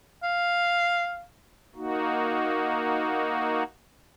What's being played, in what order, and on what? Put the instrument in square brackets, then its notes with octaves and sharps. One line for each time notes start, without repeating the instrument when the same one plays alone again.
[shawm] F5
[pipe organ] A#3 D#4 F#4